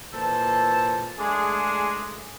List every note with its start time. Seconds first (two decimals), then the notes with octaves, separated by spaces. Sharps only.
0.14 A#2 E3 A4 C5 A5
1.19 G#3 A3 D4 G#4